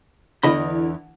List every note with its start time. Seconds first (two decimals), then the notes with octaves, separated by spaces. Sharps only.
0.43 E2 D3 E3 D#5 B5